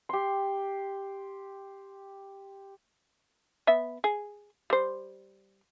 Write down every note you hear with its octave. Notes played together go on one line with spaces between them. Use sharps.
G4 C6
B3 E5
G#4
G3 C5